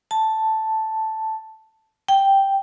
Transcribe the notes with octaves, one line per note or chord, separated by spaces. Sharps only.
A5
G5